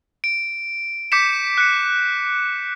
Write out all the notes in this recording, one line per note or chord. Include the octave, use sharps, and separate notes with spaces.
D7
D6 G6 B6 C#7 E7
F#6 C#7